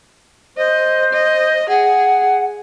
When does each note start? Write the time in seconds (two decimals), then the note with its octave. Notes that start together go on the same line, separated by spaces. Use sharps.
0.57 C5 D#5
1.13 D#5
1.69 G#4 F#5